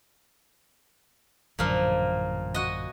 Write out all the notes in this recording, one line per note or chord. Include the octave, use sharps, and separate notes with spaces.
A1 F#2 A#2 D3 F3 A#3
F#4 D#5